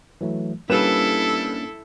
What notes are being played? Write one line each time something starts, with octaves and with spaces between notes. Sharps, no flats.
E3 F#3 A3
G3 A#3 C#4 D4 E4 A4 B4 E7